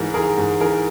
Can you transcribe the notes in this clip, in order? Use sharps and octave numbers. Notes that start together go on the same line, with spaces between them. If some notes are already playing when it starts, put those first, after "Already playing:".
Already playing: G#2 E3 G#4 A#4
E3 G#4 A#4
G#2
E3 G#4 A#4